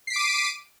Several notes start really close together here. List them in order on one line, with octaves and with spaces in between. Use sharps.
C7 B6 D7 D6 D#7